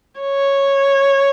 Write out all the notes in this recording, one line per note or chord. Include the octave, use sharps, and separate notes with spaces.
C#5